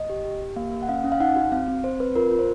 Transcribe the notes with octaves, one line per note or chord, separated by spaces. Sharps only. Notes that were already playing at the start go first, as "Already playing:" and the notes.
Already playing: D#5
G4
G4
G4
A#3 F5
A#3
F#5
C#4 F5
C#4
F5
D#4 F#5
F#4
C4 F5
C4
C4 C5
C4 B4
F4 A#4
F4
C5